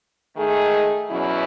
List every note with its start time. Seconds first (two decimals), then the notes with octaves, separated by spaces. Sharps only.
0.37 D#3 A3 D#4 G#4
1.10 E2 B2 F#3 C#4 E4